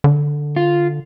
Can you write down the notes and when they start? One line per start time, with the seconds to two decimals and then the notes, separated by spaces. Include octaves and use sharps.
0.04 D3
0.56 F4